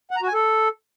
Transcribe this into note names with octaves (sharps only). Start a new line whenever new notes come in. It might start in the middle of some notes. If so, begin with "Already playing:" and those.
F#5
A#5
F#4
G#5
A4